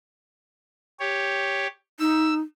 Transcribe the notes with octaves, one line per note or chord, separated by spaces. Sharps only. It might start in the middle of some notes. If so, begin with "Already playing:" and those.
G4 C#5
D#4 E6